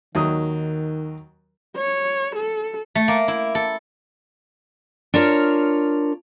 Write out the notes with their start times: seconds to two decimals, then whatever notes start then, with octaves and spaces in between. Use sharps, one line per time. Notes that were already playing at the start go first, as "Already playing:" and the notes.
0.15 D#2 D#3 F#3 D#6
1.77 C#5
2.36 A4
2.95 A3
3.08 A#3
3.28 E4
3.55 A4
5.14 D4 F4 A#4 C#5